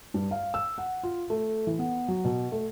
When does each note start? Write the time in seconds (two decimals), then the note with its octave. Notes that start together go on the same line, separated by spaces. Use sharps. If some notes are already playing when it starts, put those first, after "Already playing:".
0.14 G2
0.31 F5
0.54 E6
0.78 F#5
1.03 F4
1.30 A3
1.67 E3
1.79 B3
2.08 F#3
2.25 B2
2.52 A3